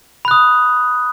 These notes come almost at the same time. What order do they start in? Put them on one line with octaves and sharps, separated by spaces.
B5 F#6 D#6